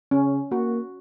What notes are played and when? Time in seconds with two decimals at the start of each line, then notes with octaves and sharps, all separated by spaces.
0.11 C#3 C#4
0.51 A#3 F#4